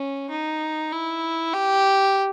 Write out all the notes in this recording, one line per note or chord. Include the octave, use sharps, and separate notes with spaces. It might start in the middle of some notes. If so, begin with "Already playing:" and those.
Already playing: C#4
D#4
E4
G4